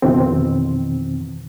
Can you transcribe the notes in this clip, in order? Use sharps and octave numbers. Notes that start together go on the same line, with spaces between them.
F2 B2 D#3 E3 C4